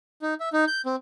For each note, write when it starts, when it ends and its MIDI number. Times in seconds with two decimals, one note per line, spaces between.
0.22 0.34 63
0.40 0.49 76
0.53 0.65 63
0.67 0.82 91
0.86 0.96 60